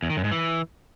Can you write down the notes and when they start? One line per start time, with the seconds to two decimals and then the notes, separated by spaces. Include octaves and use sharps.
0.03 E2
0.10 D#3
0.17 F#2
0.24 G#2
0.32 E3